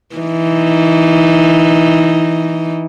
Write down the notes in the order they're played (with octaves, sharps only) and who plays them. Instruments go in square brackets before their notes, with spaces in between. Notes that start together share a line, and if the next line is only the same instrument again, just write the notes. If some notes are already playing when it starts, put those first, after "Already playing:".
[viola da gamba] E3 D#4